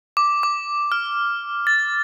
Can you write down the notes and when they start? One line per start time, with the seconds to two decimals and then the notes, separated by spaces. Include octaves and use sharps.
0.17 D6
0.43 D6
0.92 F6
1.67 A6